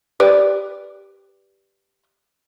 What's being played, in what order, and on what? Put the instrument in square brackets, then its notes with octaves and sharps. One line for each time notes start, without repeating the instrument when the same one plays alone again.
[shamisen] G4 B4 D5